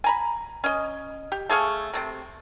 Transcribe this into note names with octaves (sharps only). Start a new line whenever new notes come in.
G#5 A#5 B5
C#4 D#5
G4
A3 G#4 C#5 F5
C3 A3 C4